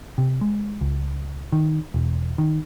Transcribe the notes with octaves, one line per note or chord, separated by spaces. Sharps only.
C3
G#3
C#2
D#3
E1
D#3